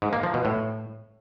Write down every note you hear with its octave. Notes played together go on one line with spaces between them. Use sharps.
G#2
A#3
F3
B2
A2